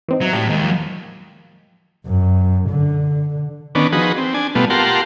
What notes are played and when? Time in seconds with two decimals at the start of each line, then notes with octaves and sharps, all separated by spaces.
0.08 E3 C4 D#4
0.22 F#3 D#5 E5 A#5
0.33 A2 G3 A5
0.49 D#2 G#3 A#3 D#5
0.64 F3 F#3
2.06 F#2
2.69 D3
3.75 D#3 B3 C#4 D4
3.92 F3 D#4 F#4 G#4 B4
4.18 C4
4.34 D4 G#5
4.55 B2 G3 A3 B3 F4
4.70 F4 G4 A#4 F#5 A5 C6